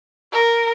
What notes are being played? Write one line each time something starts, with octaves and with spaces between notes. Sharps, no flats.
A#4